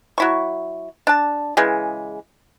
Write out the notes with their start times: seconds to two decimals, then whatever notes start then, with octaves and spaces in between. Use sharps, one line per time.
0.18 F#3 E4 C#6
1.07 D4 A5
1.57 C#3 E3 G#3